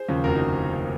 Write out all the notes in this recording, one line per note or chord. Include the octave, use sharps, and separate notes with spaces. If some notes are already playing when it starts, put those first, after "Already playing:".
Already playing: G#4 C5
D#2 C#3 F3
F1 F#4 A#4
D#4 F#4